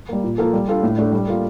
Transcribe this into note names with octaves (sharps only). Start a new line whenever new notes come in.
G3 A#3
A#2
F3 A#3 F4 A4
G3
D4 F4 A4
A2
A3 D4
G3
A#3 F4 A4